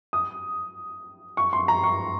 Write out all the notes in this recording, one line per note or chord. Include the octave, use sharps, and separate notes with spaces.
D#6
C#6
C6
A#5
C#6